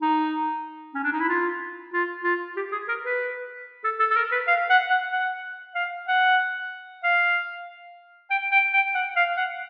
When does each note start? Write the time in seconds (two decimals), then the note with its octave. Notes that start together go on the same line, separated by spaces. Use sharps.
0.02 D#4
0.95 C#4
1.04 D4
1.13 D#4
1.20 E4
1.29 F4
1.93 F4
2.24 F4
2.57 G4
2.72 G#4
2.88 A#4
3.04 B4
3.84 A4
4.00 A4
4.11 A4
4.16 A#4
4.32 B4
4.48 F5
4.70 F#5
4.90 F#5
5.12 F#5
5.75 F5
6.08 F#5
7.04 F5
8.30 G5
8.52 G5
8.73 G5
8.95 F#5
9.16 F5
9.37 F#5